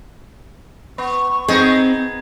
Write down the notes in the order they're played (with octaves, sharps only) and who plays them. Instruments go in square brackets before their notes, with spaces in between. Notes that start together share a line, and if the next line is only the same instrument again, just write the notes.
[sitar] B3 [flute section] C#6
[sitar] B3 D#4 G#4 [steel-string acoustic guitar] C4